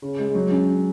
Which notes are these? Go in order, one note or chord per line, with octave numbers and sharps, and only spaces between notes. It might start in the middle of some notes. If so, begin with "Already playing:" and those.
C#3
G#3
F#3
C#4